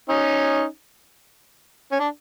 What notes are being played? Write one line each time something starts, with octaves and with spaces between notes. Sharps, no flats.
C#4 D#4
C#4
D4